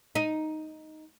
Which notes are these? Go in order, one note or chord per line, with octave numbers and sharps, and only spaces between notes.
D#4